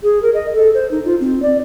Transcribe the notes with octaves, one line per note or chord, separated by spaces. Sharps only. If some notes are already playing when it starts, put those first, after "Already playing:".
G#4
A#4
D#5
A4
C5
D#4
F4
C4
D5